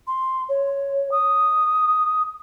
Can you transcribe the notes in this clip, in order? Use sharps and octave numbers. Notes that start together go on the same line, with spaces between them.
C6
C#5
D#6